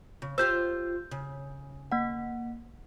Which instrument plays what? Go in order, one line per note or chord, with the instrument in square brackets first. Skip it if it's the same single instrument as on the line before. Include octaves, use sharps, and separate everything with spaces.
[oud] C#3
[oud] F4 G4 C5 [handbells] E6 G6
[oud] C#3
[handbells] A#3 F#5